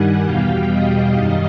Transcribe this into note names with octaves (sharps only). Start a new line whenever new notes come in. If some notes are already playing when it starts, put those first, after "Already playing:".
Already playing: G2 D#3 G3 F#5 G#5
E2 B2 G3 F5 G5
D#5 F5
F#2 D#3 G3